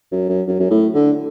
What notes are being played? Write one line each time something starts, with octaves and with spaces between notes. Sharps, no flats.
F#2
F#2
F#2
F#2
A2
D3